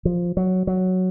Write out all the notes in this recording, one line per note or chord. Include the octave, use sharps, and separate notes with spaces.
F3
F#3
F#3